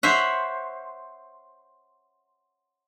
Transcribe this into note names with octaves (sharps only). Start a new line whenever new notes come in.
C5 C#5 E5 F#5